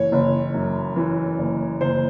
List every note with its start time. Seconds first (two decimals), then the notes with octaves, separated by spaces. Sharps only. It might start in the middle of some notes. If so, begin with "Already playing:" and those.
Already playing: F#1 E3 C#5
0.12 F#1
0.54 F#2
0.96 E3
1.38 F#1
1.81 F#1 C5